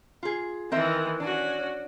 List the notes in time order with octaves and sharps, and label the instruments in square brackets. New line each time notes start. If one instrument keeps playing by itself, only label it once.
[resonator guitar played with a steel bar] F4 G#4
[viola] D#3 E3 [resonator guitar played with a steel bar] C4 A#4 E5
[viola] C#4 F#4 [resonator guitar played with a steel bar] D4